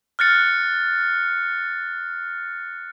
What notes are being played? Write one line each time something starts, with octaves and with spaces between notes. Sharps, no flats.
F6 F#6 A6 C#7